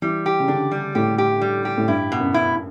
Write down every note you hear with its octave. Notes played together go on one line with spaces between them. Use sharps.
E3 G3
G4
C#3
D3 D4
G3
A2 G4
G4
G3
G4
A2
G2 E4
B2
F#2
E4